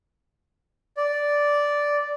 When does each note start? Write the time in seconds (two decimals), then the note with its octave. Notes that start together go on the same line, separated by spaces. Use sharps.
0.97 D5